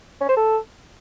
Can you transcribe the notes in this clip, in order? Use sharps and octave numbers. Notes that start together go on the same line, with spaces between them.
C#4
C5
A4